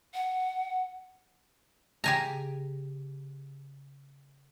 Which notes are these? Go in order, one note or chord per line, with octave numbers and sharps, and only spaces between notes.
F#5
C#3 G4 G#5 A#5